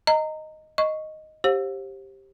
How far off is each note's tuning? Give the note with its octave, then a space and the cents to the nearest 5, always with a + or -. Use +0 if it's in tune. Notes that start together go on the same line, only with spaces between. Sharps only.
D#5 +0 A#5 -20
D#5 +0 C#6 +0
G4 +0 C5 +30 F5 +40